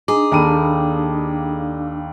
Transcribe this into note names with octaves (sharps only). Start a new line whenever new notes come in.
D4 D#4 G#4
D#2 G3 A#3 A4 D#7